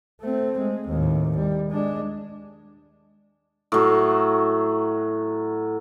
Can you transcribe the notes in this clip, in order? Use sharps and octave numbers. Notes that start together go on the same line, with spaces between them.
A3 C4
G#3
D#2 A2
G3
G#3 D4
A2 F#3